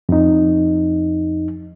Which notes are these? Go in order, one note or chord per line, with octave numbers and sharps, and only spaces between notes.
F2 D#4